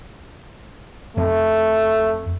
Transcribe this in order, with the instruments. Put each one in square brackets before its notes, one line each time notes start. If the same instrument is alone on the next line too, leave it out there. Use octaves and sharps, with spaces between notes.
[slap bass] F2 C4 [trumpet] A3